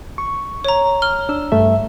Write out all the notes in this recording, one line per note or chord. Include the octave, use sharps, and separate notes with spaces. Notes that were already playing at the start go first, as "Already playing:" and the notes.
C#6
C#5 A#5
F6 G7
D4 E6
G2 A3 E5